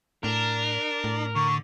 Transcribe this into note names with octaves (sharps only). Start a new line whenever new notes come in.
A2 D4 A#4
A2
D3 C#6